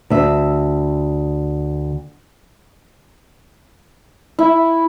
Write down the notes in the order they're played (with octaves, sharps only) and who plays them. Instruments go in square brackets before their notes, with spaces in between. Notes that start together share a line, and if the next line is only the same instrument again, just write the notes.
[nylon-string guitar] D2 E5
[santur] E4